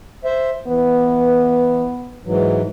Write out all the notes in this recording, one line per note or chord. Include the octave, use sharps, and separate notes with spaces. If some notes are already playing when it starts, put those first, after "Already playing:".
C5 E5
E3 B3
G#2 E3 F#3